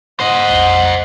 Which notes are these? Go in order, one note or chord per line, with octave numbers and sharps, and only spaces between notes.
C5 D#5 F#5
A#1 F2